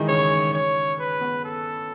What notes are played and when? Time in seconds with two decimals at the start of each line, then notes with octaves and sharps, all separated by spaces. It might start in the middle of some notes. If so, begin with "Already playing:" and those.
Already playing: D#3 E3 G#3 D#4 E4 G#4
0.08 C#3 C#4 C#5
0.53 C#5
0.99 B4
1.21 B3
1.44 A4